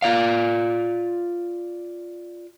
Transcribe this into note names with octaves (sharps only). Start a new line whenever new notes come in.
F4 D5 F5